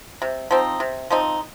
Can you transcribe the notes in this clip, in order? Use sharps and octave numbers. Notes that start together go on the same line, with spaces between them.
C3
F3 C4 D#4
C3
F3 C4 D#4